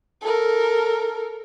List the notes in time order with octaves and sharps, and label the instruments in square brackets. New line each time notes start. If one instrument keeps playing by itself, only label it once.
[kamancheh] A4 A#4